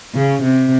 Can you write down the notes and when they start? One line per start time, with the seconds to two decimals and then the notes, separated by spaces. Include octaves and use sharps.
0.15 C#3
0.43 C3